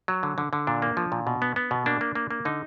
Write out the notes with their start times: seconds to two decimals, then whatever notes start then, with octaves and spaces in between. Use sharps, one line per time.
0.08 F#3
0.23 D3
0.38 D3
0.53 D3
0.67 A#2 D4
0.82 A#3
0.97 F3
1.12 A#2
1.27 B2
1.42 B3
1.56 B3
1.71 B2
1.86 A#3 D4
2.01 A#3
2.15 A#3
2.31 A#3
2.45 D3 D#4